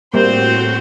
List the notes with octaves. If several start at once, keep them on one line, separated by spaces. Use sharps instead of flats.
A2 G3 A#3 C4 F#4 C5